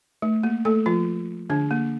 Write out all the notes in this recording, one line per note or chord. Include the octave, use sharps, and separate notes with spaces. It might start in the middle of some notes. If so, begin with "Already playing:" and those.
A3
A#3
A3 A4
F3 F4
D3 D4
A#3